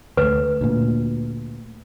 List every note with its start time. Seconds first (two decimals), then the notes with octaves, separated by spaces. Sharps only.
0.17 D2 A3 B4
0.61 D2 A#2